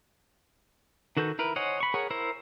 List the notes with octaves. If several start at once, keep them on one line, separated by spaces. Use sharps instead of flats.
D#3 F#4 A4 B4 G6
E4 A#4 B4
C5 C#5 D#5 F#5 G#5
B5 C#6
G#4 A#4 C#5 F#5
E4 A#4 C5 E5